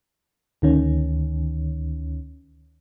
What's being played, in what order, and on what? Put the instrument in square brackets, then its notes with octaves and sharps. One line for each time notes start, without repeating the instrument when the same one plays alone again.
[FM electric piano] D2 D#3 C#4